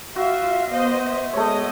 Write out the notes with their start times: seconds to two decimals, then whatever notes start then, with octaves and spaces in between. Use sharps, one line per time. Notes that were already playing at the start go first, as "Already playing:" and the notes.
0.16 F4 F#4 E5 F5
0.71 B3 C5 D#5
1.02 E5
1.33 G#3 A3 B3 C#5 D#5